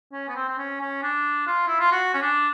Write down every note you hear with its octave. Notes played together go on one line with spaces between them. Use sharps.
C#4
B3
C4
C4
C#4
C#4
D4
F4
E4
F4
F#4
C#4
D4